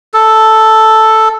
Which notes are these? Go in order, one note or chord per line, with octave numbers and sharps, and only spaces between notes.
A4